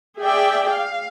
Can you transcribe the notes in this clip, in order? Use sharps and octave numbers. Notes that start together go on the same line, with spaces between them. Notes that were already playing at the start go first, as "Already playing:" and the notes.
G#4 D5 E5 G5
F5